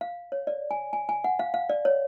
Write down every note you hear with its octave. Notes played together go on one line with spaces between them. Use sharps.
F5
C#5
D5
G#5
G#5
G#5
F#5
F5
F5
D5
C#5